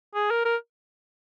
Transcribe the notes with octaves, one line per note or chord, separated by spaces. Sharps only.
G#4
A#4
A#4